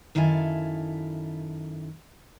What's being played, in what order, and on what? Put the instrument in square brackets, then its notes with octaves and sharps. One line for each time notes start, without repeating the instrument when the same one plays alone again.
[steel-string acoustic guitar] F#2 D#3 E4 A4 F5 G#5